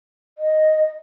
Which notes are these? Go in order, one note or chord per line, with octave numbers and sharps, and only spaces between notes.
D#5